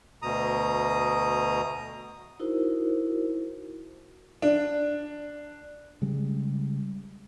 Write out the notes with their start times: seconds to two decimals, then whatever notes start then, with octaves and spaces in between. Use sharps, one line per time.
0.22 D2 B2 A#5 D#6
2.40 D#4 E4 F#4 A#4 C5
4.42 D4
6.02 C#3 G3 G#3